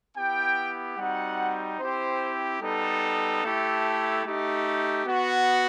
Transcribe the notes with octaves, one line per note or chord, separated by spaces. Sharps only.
B3 E4 G4 G5
G3 C4 D#4 F#4 F#5
C4 E4 G4 C5
G3 B3 D#4 A4
A3 E4 G4
A3 D#4 G4
B3 F#4